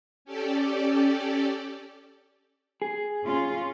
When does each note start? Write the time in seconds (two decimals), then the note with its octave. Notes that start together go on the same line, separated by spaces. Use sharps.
0.25 C#4 G4 A4 D5
2.82 G#4
3.23 C#4 F4